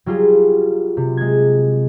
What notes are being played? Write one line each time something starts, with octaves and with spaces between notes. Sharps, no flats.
F#3 G3 F4 G#4
C3
G#3 G#6